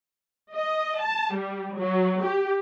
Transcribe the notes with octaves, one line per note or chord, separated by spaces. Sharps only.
D#5
A5
G3
F#3
G4